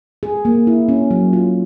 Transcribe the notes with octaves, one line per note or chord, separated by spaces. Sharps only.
G#4
A#3
E4
C#4
F#3
F4